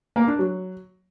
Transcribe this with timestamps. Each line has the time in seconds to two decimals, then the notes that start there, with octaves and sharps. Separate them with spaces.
0.16 A#3
0.27 D4
0.39 F#3